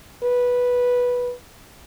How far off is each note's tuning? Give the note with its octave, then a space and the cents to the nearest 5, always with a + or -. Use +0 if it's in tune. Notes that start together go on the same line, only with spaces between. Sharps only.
B4 -10